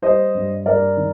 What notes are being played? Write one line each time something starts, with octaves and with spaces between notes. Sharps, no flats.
G3 C5 D#5
G2
G2 A#4 D5
D#3